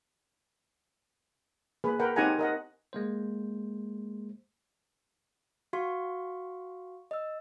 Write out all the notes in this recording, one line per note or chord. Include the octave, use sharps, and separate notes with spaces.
A#3 G#4 B4
A#4 B4 F#5 G5
C4 D#4 G4 F#5 G#5 A#5
A#4 D#5 F#5
G#3 A#3 C5
F#4 F5 C6 C#6
D#5 E6